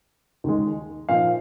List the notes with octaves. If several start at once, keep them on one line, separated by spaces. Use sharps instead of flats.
D#2 D#3 G#3
A#2 F3 A#3 D#4 F5